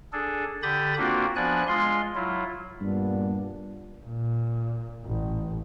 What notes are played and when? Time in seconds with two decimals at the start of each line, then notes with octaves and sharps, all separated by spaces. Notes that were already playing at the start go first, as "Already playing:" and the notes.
0.13 D4 G#4 A4
0.63 D3 G4 B5 D#6 G6 A6
0.98 A#3 C4 D4 F4 F#4
1.36 F3 B3 D4 D5 G#5 F#6
1.67 G#3 F4 C6
2.15 F#3 E4 F4
2.81 G2 A#2 B3 D4
4.05 A#2
5.06 A1